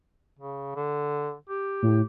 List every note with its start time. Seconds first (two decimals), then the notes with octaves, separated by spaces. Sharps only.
0.39 C#3
0.75 D3
1.49 G4
1.82 A2